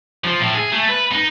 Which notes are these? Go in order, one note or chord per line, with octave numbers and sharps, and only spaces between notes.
F3
A2
G#4
A3
B4
D#4